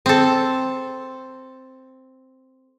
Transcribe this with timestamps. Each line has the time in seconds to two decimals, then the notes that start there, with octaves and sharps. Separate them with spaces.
0.06 C4 A4